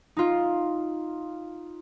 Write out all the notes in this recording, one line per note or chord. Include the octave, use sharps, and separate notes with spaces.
D#4 F4